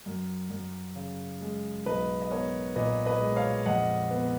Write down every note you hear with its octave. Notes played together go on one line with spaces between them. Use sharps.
F#2
F#2
C#3
G#3
B1 B4 D#5
D#5
B3 A#4 C#5
A#2 B4 D#5
B4 D#5
G#3
C#5 F5
F2 D#5 F#5
B3